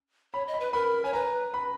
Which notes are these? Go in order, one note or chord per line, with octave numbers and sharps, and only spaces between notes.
C#5 B5
D#5
B5
B4
A#4 B5
C#5 G#5
B4 A#5
B5